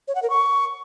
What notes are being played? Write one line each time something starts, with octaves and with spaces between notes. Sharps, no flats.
C#5
F#5
A#4
C#6